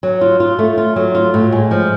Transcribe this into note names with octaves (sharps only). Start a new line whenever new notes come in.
F#3
F4
F4
A3
F4
F#3
F4
A2
G#3
F3